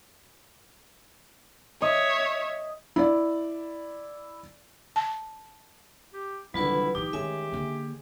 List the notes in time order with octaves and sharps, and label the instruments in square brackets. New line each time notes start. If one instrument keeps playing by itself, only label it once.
[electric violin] C#5 E5 [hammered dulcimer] D#5
[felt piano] E4 D5
[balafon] A5
[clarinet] G4
[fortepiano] C2 D3 [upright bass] D#3 [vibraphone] F#3 F4 B4 [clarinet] E4
[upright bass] A#2 E3 [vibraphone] D#4 [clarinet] G4 [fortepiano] D6
[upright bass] D#3 A3 [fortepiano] G#3 C#4 [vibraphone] E5 G#5
[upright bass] D3 A#3